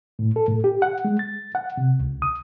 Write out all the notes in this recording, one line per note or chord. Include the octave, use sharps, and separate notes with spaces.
A2
A4
A2
G4
F#5
G#3
A6
F#5
C3
C#2
D#6